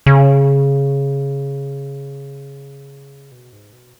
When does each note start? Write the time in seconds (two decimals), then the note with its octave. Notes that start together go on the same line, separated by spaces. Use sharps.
0.06 C#3
3.32 B2
3.53 G#2
3.73 B2